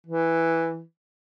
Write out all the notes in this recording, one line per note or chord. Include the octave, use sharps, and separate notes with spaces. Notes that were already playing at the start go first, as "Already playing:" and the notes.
E3